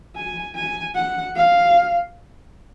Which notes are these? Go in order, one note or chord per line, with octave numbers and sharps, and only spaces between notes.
G#5
G#5
F#5
F5